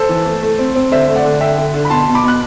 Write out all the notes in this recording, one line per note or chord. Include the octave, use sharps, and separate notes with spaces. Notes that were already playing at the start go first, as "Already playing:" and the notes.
Already playing: A4 C5
E3
A3
A3
C4
C4
D3 C5 E5
A3
D5 F#5
D3
D3 E5 G5
D3
D3
B5
B2 A5 C6
B2
B5 D6
B2 F#6